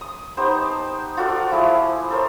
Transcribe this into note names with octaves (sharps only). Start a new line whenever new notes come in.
D#6
B3 D#4 G4 C5
A5
F4 F#4 A4 D5
F3 E4 G#4
A4 A#4 C5 C#5